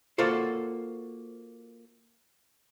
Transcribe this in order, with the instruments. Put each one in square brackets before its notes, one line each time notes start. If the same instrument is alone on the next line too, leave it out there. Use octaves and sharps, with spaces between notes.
[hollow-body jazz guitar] A#3 F4 F#4 A4 C5